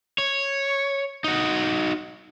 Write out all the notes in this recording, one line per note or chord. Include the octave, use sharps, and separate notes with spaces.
C#5
D#4 F#4